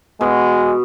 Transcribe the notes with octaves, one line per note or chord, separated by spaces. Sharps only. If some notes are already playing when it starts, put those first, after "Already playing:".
B2 G#3